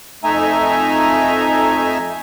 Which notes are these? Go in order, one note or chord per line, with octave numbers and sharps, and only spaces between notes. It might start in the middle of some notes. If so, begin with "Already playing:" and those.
F2 A3 D#4 E5 G#5 A#5